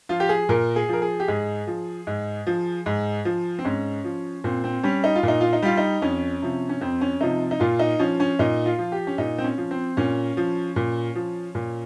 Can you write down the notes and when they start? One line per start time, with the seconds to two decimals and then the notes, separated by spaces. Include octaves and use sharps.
0.09 F3 F4
0.20 G4
0.29 G#4
0.49 A#2 A#4
0.76 G#4
0.89 F3 A#4
1.02 G#4
1.20 G4
1.28 G#2 G#4
1.67 F3
2.07 G#2
2.47 F3
2.86 G#2
3.25 F3
3.59 C4
3.65 G#2 C#4
4.04 F3
4.44 A#2 C4
4.64 C4
4.83 G3 C#4
5.04 D#4
5.16 F4
5.23 A#2
5.28 D#4
5.41 F4
5.53 D#4
5.62 G3 F4
5.78 D#4
6.02 F2 C#4
6.42 C3 F3
6.69 C#4
6.81 F2 C4
7.01 C#4
7.21 C3 F3 D#4
7.51 D#4
7.60 A#2 F4
7.79 D#4
7.99 F3 C#4
8.20 C#4
8.39 A#2 D#4
8.66 F4
8.79 F3
8.92 G4
9.07 C#4
9.18 A#2 D#4
9.38 C4
9.44 C#4
9.58 F3
9.71 C4
9.97 A#2 C#4
10.37 F3
10.76 A#2
11.16 F3
11.55 A#2